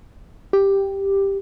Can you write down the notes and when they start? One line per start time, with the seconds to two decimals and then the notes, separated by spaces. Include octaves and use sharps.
0.53 G4